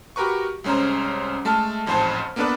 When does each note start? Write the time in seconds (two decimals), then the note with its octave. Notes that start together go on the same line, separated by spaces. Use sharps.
0.16 F#4 G4 A#4 B4 C#6
0.64 C2 G#3 C#4 C5 A#5
1.45 G#3 A3 A5 F6
1.86 A1 F2 G#2 C5 G#5 A5
2.36 A#3 B3 D4 A4 B4 D5